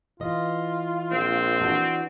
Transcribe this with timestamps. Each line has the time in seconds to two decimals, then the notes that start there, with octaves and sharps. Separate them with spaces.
0.20 E3 F4 D#5
1.11 A#1 C4
1.61 E3 D4 F#4